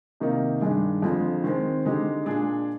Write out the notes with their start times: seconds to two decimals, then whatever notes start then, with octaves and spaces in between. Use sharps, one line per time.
0.20 C3 D#3 A#3 D#4
0.61 G2 D#3 G#3 D4 G#4
1.02 F2 D3 F3 G#3
1.44 D#3 G#3 C4
1.85 D3 G#3 D#4 G4
2.26 A#2 G#3 D4 G#4